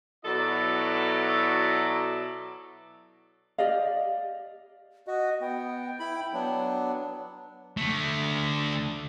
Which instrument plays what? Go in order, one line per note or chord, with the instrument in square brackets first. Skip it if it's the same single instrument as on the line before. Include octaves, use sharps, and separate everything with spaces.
[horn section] B2 F#3 E4 A4 D5 B5
[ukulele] G4 D5 D#5 F5
[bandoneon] F#4 [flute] D#5
[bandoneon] B3 [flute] G5
[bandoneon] E4 B5
F#3 B3 D4
[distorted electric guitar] D3 A3